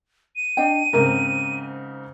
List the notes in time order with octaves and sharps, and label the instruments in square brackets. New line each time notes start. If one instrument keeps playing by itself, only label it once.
[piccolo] D#7
[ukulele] D4 D#5 G5
[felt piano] G#2 C#3 C4 [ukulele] A#4